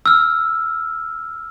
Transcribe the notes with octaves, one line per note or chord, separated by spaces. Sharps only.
E6 F6